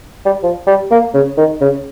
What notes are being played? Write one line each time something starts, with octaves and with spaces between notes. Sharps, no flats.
G3
F3
G3
A#3
C#3
D#3
C#3